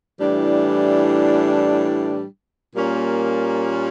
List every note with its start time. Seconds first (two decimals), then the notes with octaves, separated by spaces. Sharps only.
0.19 A2 E3 G3 D4
2.73 A#2 G3 A#3 C#4